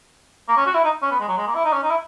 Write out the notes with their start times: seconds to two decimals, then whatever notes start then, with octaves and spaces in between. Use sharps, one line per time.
0.49 A#3
0.57 C#4
0.66 F#4
0.74 E4
0.84 D#4
1.02 C#4
1.11 B3
1.20 G#3
1.28 F#3
1.37 G#3
1.47 A#3
1.55 E4
1.65 D#4
1.73 C#4
1.83 D#4
1.91 E4